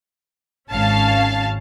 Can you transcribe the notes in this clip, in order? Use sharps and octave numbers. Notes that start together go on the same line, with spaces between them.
G#1 C#4 F5 A5